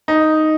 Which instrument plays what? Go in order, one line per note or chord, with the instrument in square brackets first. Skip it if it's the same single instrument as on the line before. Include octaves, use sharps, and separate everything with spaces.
[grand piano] D#4